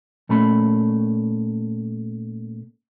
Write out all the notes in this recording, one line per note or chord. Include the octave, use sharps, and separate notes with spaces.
A#2 A3 C#4 B5